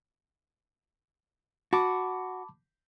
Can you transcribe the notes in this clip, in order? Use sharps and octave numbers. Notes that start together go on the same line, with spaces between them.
F#4 A5 B5 D6